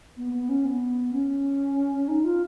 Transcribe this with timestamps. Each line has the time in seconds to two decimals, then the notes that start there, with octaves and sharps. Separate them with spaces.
0.17 B3
0.33 B3
0.49 C#4
0.65 B3
1.13 C#4
2.08 D#4
2.25 F4